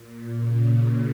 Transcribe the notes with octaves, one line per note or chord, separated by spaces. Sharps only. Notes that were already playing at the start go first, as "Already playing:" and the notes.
Already playing: A#2
C#3